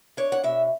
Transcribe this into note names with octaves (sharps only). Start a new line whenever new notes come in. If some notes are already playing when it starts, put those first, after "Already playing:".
D4 C#5
F#5
B2 E5